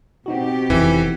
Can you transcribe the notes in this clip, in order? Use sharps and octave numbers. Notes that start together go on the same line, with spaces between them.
B2 C4 D#4 F#4 G4
F1 F2 E3